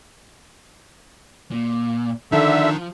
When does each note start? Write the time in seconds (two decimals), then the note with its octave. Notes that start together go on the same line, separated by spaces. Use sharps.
1.51 A#2
2.32 D3 D#3 F3 D4 D#4 E5